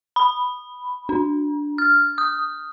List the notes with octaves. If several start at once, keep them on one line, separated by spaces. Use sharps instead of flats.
B5
D4
F6
D#6